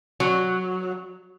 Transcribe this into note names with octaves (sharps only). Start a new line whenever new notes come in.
F#3